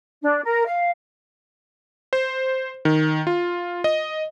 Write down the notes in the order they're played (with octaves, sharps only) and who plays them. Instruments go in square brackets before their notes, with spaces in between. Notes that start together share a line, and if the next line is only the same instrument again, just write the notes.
[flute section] D4
A#4
F5
[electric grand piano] C5
D#3
F4
D#5